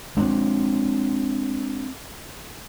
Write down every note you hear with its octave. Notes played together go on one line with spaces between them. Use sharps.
G#3 C4 D4